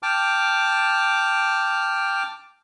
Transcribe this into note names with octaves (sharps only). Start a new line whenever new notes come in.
G5 A5 D6 F6